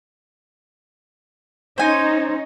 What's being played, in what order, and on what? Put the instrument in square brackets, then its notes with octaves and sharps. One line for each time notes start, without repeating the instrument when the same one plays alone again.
[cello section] C#4 D#4 [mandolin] C5 G#5